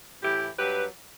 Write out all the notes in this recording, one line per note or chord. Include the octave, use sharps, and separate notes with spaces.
A2 E3 E4 G4
G2 F#3 G4 B4